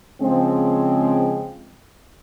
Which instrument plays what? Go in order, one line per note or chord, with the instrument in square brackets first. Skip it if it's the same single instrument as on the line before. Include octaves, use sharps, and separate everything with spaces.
[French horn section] C#3 F3 G#3 C4